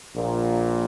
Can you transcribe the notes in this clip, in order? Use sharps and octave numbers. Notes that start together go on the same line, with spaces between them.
A#1 A#2